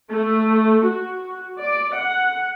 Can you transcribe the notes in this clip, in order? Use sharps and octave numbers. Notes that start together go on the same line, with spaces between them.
A3
F#4
D5
F#5